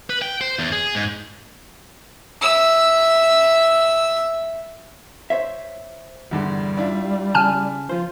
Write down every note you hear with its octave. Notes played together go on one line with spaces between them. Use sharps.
B4
G5
C5
E2
G#4
G#2
E5 E6
C5 C#5 E5
E2 G2 D3 G3
D4 E4 F4
C#3 G#5 A5 F6
F3 F4 C5